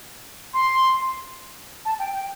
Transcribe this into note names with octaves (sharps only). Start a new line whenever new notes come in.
C6
A5
G5
G5